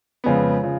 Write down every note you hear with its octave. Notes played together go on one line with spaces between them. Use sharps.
F2 C#3 F3 G#3 B3
C#3 F3